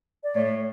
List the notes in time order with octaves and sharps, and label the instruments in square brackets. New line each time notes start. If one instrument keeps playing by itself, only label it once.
[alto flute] D5
[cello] A2 [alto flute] C#5